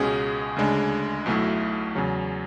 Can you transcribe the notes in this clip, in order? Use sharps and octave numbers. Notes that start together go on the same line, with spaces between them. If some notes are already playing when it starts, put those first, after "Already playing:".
Already playing: C#2 B2 G#3 C#4 G#4
D2 C#3 G#3 D4
B1 B2 A3 E4
E2 C#3 F#3